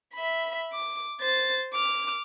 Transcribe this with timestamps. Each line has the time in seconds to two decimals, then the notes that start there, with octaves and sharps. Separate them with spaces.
0.14 E5 B5
0.73 D6
1.21 C5 A6
1.73 D6 F6